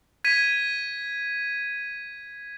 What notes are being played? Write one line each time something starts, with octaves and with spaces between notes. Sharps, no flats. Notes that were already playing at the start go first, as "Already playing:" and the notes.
G#6 B6 D#7